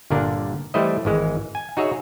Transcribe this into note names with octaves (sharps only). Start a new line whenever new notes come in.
G1 A#2 D3 D4 A#4
E3 G3 A3 E4 C5 D#5
G#1 E3 G#3
G#5
D#4 F#4 G#4 C#5 E5